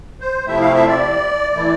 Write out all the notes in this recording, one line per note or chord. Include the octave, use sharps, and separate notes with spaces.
C5
C3 F3 A3 C4 E4 E5
F5
E5
D5
E3 A3 E4